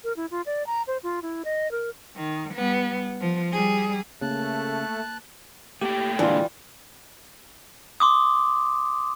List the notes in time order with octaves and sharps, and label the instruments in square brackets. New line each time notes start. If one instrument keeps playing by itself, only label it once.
[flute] A#4
E4
F4
D5
A#5
C5
F4
E4
D#5
A#4
[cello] D#3
G3 B3
F3
G3 G#4
[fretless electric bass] C#3 [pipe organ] A3 [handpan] A#3 [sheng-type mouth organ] A5 F#6
[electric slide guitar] A3 A#3 G5 [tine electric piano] G4
[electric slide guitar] A#2 D3 G#3 [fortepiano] E3 F4 [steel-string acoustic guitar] G3 [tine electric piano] D4
[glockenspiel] C6 D6 D#6